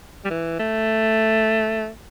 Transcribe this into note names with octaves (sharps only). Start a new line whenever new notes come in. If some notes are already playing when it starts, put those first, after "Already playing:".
G3
E3
A3